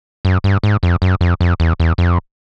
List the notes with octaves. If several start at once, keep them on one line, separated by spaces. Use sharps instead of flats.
F#2
G2
G#2
F2
F#2
F2
F2
E2
E2
F2